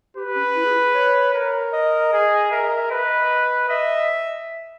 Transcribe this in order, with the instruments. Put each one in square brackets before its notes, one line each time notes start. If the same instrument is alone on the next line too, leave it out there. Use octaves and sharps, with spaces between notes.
[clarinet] G4 [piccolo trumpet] B4
[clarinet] C#4
E4
G#4
C#5
[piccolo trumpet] A#4
[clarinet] D#5
[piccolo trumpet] G#4
[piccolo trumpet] A#4 [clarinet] E5
[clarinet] D#5
E5
[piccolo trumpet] B4 [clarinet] D#5
[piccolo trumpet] D#5 [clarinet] E5